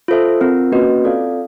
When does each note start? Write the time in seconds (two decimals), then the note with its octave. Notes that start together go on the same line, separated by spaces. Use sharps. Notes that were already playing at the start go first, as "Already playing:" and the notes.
0.08 F4 A4 C5 E5
0.41 C4 F4 A#4
0.72 A#3 C#4 F#4 B4 D#5
1.04 C4 F4 A4 D5 F5